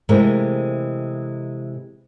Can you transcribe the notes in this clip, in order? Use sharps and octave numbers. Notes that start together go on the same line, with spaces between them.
C3 E3 G#3 A3 C4 A#4